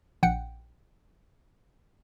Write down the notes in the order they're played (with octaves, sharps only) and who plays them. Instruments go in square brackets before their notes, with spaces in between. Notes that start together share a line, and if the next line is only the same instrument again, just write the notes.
[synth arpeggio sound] A#1 F#5 G5 C#7